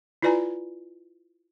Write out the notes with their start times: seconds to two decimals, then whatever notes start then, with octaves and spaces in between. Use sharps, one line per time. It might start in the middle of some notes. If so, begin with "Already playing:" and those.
0.22 E4 F4 B4 D5 G#5 A#5